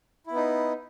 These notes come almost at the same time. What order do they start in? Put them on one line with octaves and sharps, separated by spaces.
E4 B3 D#4